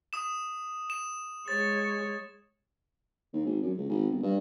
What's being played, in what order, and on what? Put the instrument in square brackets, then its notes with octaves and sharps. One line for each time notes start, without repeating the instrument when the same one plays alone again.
[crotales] D#6 E7
E7
[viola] G#3 C#5 [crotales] A6
[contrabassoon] D#2
G#1
F#2
C#2
G#1
G1
G2